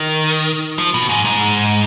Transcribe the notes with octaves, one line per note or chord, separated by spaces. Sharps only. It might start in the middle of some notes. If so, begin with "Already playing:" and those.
Already playing: D#3
F3
B2
G#2
G#2